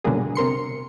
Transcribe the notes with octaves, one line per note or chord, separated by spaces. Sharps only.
B2 D3 F#3 G3 A#3 G#4
C3 A#4 C6 C#7